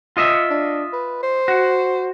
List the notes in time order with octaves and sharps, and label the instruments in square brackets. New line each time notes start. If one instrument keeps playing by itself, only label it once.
[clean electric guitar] F4 D#5 E5
[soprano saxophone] D4
B4
C5
[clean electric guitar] F#4